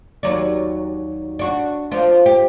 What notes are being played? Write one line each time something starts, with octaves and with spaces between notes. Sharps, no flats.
D#2 F#3 D5
D4 F#4
F3 D4
G4